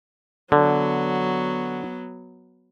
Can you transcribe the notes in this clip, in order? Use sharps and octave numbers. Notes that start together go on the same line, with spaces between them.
D3 F#3 B3